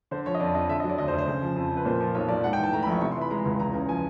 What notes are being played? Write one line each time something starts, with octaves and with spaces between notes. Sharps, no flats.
D3 C5
F3 C#5
D#5
F2 D5
F2 D#5
D3 E5
D#5
F#3
D5
D2 D#5
C5
D2
C5
C#3
F3
F2
F2
B4
A#2 C5
F3
B1 C#5
B1 D5
G#2 F#5
G5
E3
A5
A3 A#5
B5
A#1 C#6
C3 C#6
C6
E3
B5
G#3 A#5
C#2
E2 A#5
C#3
F3 G#5